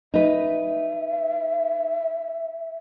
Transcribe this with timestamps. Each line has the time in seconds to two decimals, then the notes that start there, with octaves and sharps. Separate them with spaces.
0.14 D#4 B4 E5